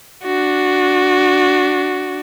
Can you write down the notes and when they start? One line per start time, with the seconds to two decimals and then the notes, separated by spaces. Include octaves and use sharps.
0.24 D4 F#4